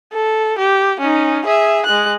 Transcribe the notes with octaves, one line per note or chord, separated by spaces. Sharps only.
A4
G4
C#4 D#4
G#4 E5
G#3 F#6